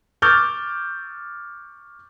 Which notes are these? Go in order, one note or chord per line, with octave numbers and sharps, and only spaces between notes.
C#6 D6 E6 F6 G6 A6